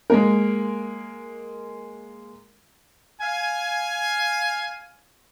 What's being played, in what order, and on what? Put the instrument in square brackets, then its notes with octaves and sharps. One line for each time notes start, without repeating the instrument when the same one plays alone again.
[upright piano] G#3 A#3 A#4
[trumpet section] F5 G#5